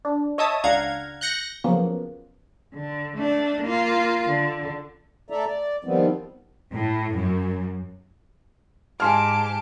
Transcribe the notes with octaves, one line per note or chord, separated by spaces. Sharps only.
D4
C#5 D#5 E5 A5 D#6
C#2 D4 F5 F#5 A#5 G#6
F#6 G6 A#6 C#7
C#3 F3 F#3 A#3 B3
D3
A3 D4
A#3 F4
D3
A3 A4 D5 E5 A#5
D5
D#3 F3 G3 B3 C4
A2
F#2
G#2 G4 G#5 A5 C6 D6 F6